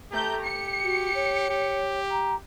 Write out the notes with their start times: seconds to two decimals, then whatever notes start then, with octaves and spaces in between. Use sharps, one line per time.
0.12 A3 G4 A#5 G6
0.45 C#7
0.84 F#4
1.15 C#5
1.50 G4
2.11 A#5